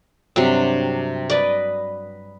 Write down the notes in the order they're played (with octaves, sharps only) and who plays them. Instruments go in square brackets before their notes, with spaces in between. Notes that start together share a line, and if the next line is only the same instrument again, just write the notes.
[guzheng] G2 [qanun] C3 F#3 D4
[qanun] B4 D#5 [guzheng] D5